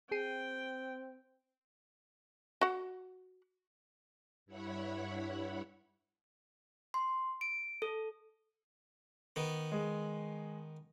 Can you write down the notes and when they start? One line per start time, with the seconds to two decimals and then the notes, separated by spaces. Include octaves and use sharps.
0.12 C4 G#4 G5 C7 D#7
2.61 F#4 F#5
4.46 G2 E4 C#5 F#5 B5
6.94 C6
7.41 D7
7.82 A4
9.36 D#3 B3
9.72 G#3